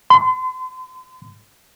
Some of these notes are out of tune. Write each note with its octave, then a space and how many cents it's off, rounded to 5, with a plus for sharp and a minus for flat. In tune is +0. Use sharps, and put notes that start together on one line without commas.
C6 -40